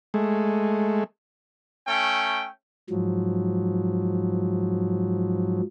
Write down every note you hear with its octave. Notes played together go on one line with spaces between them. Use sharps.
G#3 A3
A3 C#4 G5
G#2 F3 F#3